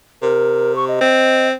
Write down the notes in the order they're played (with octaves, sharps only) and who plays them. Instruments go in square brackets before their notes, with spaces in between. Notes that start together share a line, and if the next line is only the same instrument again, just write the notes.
[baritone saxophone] C3 [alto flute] A#4
[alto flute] C#6
D#5
[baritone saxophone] C4